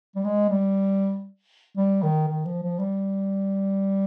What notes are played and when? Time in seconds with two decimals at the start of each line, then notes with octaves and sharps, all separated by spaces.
0.15 G3
0.24 G#3
0.49 G3
1.77 G3
2.02 D#3
2.28 D#3
2.45 F3
2.63 F3
2.79 G3